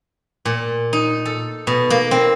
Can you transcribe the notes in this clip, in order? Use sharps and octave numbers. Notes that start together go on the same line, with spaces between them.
A#2
D#4
A4
B2
A#3
C4